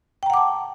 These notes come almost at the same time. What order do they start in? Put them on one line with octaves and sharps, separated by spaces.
G5 A#5 F#5 D6 A5